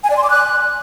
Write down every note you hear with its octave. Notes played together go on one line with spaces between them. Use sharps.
G#5
D5
C6
D6
F#6